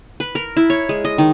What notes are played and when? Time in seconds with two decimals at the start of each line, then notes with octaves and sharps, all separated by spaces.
0.20 B4
0.35 A#4
0.57 E4
0.70 C#5
0.89 G#3
1.05 D#5
1.18 D#3